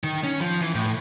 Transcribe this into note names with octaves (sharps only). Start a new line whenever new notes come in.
D#3
C#4
F3
E3
A2